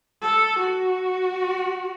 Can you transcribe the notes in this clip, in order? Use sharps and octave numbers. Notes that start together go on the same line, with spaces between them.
A4
F#4